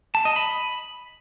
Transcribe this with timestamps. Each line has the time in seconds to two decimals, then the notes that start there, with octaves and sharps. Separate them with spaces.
0.15 A5
0.25 D#5
0.36 B5